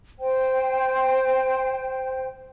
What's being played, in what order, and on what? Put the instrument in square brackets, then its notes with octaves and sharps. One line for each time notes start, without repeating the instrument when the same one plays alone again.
[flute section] C5 G5